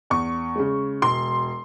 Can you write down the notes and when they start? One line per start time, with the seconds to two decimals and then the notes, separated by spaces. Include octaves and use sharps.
0.10 E2 C#6
0.55 C#3 G#3
1.02 E1 C6